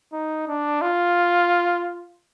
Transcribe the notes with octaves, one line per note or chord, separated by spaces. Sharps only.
D#4
D4
F4